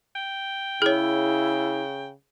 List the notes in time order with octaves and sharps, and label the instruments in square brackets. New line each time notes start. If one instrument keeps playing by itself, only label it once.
[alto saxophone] G5
[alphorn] C#3 [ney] E4 [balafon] G#4 C#5